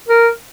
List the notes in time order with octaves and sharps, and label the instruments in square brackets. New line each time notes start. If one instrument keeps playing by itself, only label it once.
[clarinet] A#4